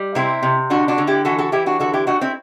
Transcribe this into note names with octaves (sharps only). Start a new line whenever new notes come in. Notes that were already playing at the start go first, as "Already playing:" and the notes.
Already playing: G3
C3 C4 E4
C3
D3 D4 F#4
D4 F#4
D3
E4 G4
E3 F#4 A4
F#4 A4
E3 E4 G4
D4 F#4
D3 F#4 A4
E4 G4
A3 D4 F#4
C4 E4